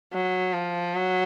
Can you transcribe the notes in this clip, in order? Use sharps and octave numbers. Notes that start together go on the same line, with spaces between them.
F#3
F3
F#3